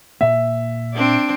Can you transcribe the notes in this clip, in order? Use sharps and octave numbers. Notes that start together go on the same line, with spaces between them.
A#2 A#3 E5
C4 D4